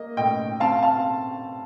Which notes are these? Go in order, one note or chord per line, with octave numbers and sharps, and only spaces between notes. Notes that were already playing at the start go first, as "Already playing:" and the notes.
Already playing: A#3 D#5
A2 D#5 G5
C4 F5 A5
F5 A5